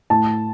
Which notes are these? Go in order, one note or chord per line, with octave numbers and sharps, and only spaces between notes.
A2 A5